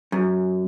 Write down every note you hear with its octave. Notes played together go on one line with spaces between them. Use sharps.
F#2